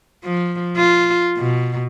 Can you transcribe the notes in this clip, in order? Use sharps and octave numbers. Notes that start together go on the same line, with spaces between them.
F3
F4
B2